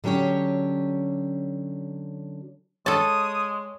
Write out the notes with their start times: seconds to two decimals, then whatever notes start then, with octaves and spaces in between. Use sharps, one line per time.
0.04 D3 F#3 C#4 G4 C#5
2.86 G#3 A4 C#5 A5 D#6